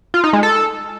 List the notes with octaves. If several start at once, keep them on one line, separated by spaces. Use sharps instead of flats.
F4
D#4
G#3
A4